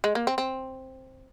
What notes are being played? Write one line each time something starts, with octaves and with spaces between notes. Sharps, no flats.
G#3
A#3
C4
C4